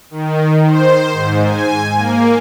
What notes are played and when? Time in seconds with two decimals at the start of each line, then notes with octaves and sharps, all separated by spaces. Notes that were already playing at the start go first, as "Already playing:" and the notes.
0.11 D#3
0.66 C5
1.13 G#2
1.45 G#5
1.97 A#3